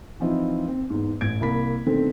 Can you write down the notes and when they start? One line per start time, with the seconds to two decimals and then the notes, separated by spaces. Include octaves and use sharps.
0.20 E3 F3 C4 D#4 E4
0.68 C4
0.90 E2 G#2
1.21 A1 G#6 D7
1.40 C2 A#3 B5 B6
1.86 B2 D3 D#3 A3 C4